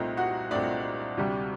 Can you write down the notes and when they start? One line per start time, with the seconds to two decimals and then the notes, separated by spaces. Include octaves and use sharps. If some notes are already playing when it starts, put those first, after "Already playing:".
Already playing: C2 A#2 A3 C4 D#4 D#5
0.17 F#4 F#5
0.51 C2 A#2 A3 C4 D4 D5
1.17 D2 C3 G3